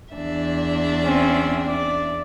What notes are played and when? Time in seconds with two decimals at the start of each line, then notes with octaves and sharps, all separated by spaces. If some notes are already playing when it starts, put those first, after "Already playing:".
0.12 E2 D4 E5
1.03 C4 C#4
1.67 D5